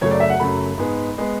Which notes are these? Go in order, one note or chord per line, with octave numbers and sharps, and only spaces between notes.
F#2 C#3 F#3 A3 C#5
D5
E5
F#5
F#2 C#3 F#3 A3 B5
G#2 G#3 B3
G#3 B3